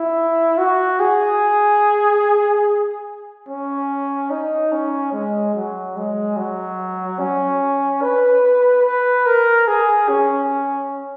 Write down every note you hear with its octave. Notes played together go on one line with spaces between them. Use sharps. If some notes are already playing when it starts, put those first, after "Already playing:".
Already playing: E4
F#4
G#4
C#4
D#4
C#4
G#3
F#3
G#3
F#3
C#4
B4
B4
A#4
G#4
C#4